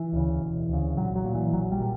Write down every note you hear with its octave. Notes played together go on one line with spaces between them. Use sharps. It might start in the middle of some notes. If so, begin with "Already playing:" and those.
Already playing: E3
D2 C#3
E1
D2 C#3
A#1 F#3
F#3
A#2
E3
A#1 F#3
G3
A#2